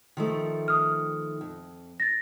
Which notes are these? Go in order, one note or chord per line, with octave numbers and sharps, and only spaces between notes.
D#3 F3 A3
D#6 F6
F2
A6 A#6